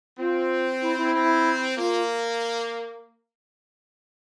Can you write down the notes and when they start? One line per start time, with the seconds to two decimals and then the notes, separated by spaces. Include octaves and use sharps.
0.18 C4 F4
0.81 E4
0.96 E4
1.12 C4
1.76 A#3 F4